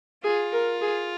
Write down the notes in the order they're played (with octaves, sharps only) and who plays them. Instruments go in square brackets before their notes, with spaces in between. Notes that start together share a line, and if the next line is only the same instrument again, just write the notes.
[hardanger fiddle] F4 [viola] G#4
[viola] A#4
G#4